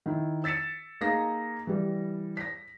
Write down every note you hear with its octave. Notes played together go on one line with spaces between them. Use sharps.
D#3 E4
E6 A6 B6 C#7 E7
A#3 D#4 G#4 A#6
E3 G3
A#6 B6